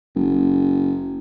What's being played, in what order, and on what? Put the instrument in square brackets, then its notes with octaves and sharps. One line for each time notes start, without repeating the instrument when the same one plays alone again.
[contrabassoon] F#1